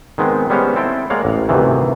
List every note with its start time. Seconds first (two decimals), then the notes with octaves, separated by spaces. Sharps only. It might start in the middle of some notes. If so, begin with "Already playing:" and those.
0.18 D#3 G#3 B3 C4
0.50 G3 G#3 B3 C#4 C5 C#5
0.76 C4 E4 A4 G5
1.10 G#3 A#3 C#5 D5 F5 F#5
1.25 A1
1.49 D2 G2 C3 D#3 E3